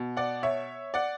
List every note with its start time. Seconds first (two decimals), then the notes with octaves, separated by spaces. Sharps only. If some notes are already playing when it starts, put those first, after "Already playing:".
Already playing: B2
0.17 D5 F#5
0.43 C#5 E5
0.94 D5 F#5